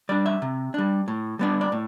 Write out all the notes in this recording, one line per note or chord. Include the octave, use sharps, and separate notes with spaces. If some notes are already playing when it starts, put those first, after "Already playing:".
G3 D4 D5
E5
C3
G3 D4
A2
G3 B3 D4
D5
A2